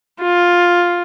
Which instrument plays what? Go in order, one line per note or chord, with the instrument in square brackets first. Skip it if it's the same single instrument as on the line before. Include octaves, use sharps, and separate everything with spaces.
[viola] F4